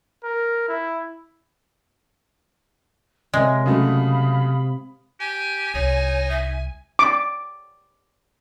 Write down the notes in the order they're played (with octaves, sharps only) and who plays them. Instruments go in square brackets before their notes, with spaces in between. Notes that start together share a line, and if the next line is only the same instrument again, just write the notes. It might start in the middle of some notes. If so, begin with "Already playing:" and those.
[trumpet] A#4
E4
[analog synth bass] C3 [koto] G#3 [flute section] A#4 C#5 E5
[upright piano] C#3 F#3 A3 [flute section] F5 B5 D#6
[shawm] G4 [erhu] G#5
[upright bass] C2 [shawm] D#4 [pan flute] C#5
[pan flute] E5
[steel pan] D6